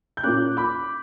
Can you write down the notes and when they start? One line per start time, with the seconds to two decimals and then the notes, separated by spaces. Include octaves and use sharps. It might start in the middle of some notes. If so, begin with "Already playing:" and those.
0.17 G6
0.23 A#2 A#3 C#4 D6 F#6
0.57 B5 D6